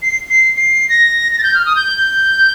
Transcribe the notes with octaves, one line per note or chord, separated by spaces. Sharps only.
C7
C7
C7
A#6
A#6
A6
G6
F6
D#6
G6